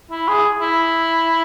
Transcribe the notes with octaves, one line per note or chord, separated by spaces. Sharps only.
E4
G#4
E4